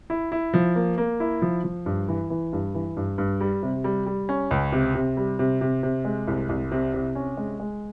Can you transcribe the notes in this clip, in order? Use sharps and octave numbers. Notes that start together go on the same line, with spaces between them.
E4
E4
F3
A#3
A#3
E4
F3
F3
G2
E3
E3
G2
E3
G2
G2
G3
C3
G3
G3
C#4
C#2
C3
C3
G3
C3
C3
C3
G#3
C2
C2
C3
C3
C#4
G#3
G#3